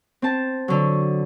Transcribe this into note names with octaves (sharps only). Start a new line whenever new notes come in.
C4 A5
D3 F#3